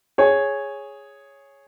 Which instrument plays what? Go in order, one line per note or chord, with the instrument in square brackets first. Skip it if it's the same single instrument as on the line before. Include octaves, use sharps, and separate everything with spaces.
[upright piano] G#4 C#5